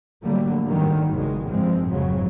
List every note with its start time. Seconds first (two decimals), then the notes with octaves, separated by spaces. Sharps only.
0.24 A2 D3 F#3 G3 A3 A#3
0.64 G#2 D3 D#3 F#3 G3
1.11 G#1 E2 C#3 G#3
1.49 G#1 G2 F3 G#3 C4
1.88 F1 F2 G#2 C#3 F#3